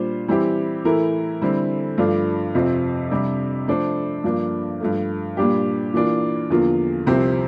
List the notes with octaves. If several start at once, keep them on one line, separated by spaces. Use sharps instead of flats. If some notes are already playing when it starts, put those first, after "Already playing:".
Already playing: A#2 G3 D4 F4 C5
E3 G3 C4 E4 G4
A2 E3 A3 E4 A#4
D3 G3 C4 E4
G2 F3 A3 D4 F4
F2 C3 F3 C4
C3 G3 D4
F3 A3 D4 A4 C5
G2 F3 A#3 D4
G2 F3 A3
A#2 G3 D4 G4
E3 A#3 D4 F4
E2 D3 F3 A#3 F4
C2 C3 F3 C4 G4